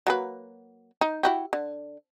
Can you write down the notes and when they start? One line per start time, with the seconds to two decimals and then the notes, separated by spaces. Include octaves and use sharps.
0.07 F#3 A#3 B4
1.01 D#4
1.23 E4 F#4 G4
1.53 D3